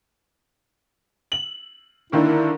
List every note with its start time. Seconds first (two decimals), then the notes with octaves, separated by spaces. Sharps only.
1.32 F#7
2.12 D3 D#3 A#3 E4